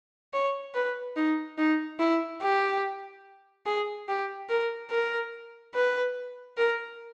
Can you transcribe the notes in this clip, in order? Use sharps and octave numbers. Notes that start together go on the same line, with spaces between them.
C#5
B4
D#4
D#4
E4
G4
G#4
G4
A#4
A#4
B4
A#4